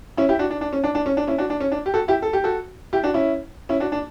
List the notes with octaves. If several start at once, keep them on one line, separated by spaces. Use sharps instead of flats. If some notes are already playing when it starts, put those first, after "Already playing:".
C#4 E4
E4 G4
D4 F#4
D4
D4
C#4
D4
D4
C#4
D4
C#4 E4
D4 F#4
D4
C#4
D4
G4
F#4 A4
E4 G4
A4
G4
F#4 A4
E4 G4
D4 F#4
C#4 E4
C#4 E4
D4 F#4
D4